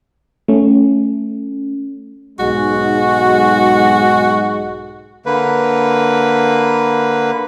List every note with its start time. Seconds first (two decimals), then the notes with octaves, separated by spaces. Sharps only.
0.48 A3 C#4
2.39 B1 G#2 G#3 F#4
5.26 D3 A#3 B4